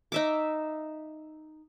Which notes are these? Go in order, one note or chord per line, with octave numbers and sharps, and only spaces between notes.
D#4 E5 D6